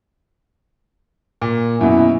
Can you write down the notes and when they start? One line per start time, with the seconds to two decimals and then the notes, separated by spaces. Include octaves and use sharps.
1.42 A#2
1.81 F#2 B2 E4